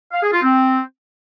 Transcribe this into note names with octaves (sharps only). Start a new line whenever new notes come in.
F5
G#4
F4
C4